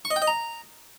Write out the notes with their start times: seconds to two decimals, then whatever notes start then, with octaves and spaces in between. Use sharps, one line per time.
0.05 C#6
0.11 D#5
0.16 G5
0.22 D#5
0.27 A#5